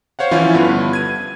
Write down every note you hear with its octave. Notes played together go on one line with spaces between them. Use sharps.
C5 C#5 F5 F#5
E3 F3 C#4 E4 F4
G2 D3 B3
G#6 D#7